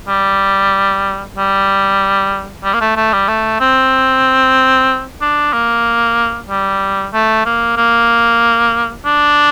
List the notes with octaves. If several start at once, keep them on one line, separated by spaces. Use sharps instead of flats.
G3
G3
G3
A#3
A3
A3
G3
A3
C4
D4
A#3
G3
A3
A#3
A#3
D4